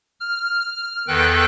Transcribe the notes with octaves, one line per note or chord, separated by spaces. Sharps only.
F6
E2 D#3 A4 B4 G5 F#6